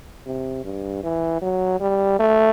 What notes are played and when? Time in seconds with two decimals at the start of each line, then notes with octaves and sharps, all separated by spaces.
0.26 C3
0.64 G2
1.03 E3
1.42 F#3
1.80 G3
2.19 A3